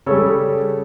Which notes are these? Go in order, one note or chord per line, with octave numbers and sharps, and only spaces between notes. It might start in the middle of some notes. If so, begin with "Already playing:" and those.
C#3 G3 A4 C#5